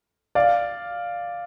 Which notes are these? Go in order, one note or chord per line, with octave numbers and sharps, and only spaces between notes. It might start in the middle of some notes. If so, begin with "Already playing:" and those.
D5 F5